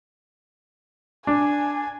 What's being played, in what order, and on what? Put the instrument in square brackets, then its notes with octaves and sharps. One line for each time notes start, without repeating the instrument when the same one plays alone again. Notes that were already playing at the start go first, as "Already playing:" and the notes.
[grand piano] D4 [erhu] G#5